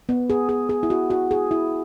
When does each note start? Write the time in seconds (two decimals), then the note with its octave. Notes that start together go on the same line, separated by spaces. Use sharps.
0.09 B3
0.30 G#4
0.49 G#4
0.69 G#4
0.83 E4
0.90 F#4
1.10 F#4
1.31 G#4
1.51 E4